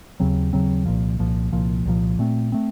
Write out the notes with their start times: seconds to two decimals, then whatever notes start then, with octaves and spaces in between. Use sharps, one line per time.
0.20 D#2 C#3 F#3 C4
0.53 D#2 C#3 F#3 C4
0.86 C2 A#2 F3
1.19 C2 A#2 F3
1.52 C2 A#2 F3
1.86 C2 A#2 F3
2.19 A#2 A3 C4
2.52 A3 C4